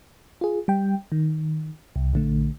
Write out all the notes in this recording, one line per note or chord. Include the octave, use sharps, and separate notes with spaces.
F4 G#4
G3 G5
D#3
C2
A#1 D3 A3